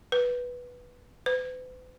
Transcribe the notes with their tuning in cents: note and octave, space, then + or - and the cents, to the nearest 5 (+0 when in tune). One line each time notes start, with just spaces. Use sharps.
B4 -5
B4 +45